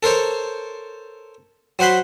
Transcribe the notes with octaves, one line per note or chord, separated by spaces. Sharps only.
A4 A#4 C5 C#5
F#3 C5 F#5 B5 C6